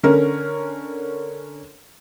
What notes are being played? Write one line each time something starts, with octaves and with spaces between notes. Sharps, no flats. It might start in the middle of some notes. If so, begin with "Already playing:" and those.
D3 C#4 A#4